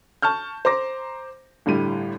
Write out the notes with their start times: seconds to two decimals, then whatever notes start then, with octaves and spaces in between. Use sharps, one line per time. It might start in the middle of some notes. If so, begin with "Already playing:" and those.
0.22 A5 C#6 F6 G6
0.65 C5 A#5 D6 A#6
1.66 G1 A2 G3 D#7